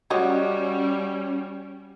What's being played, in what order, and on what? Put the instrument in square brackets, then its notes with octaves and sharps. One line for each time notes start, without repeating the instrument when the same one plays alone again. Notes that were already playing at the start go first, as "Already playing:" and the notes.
[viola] G3 [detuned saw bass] C#4 [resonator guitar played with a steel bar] F#4 [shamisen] G4 C#5 D#5